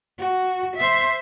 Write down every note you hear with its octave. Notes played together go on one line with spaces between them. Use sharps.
F#4
C5 E5